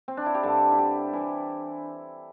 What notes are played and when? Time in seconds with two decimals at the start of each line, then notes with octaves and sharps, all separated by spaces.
0.08 C4
0.17 D4
0.26 E4
0.35 G4
0.43 G2 D3 A4
0.71 E4
0.78 G4
1.13 E3 E4